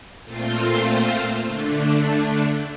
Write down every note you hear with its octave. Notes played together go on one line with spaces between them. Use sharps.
A#2 A3 C4 F4 C5
D3 A3 D4